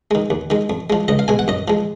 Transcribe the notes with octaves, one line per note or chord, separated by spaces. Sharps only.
D#3 G#3
D#2
D#3 G#3
F2
F3 G#3
C#2 D#5
F5
B2 G#3 G#5
F#5
F#2 D#5
F3 G#3